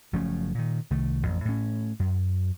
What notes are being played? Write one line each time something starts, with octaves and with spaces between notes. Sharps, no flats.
F#1 F3 A3 C#4
A#2 D#3
C2 D#3 A3
A1 F2
A2 C#4
F#2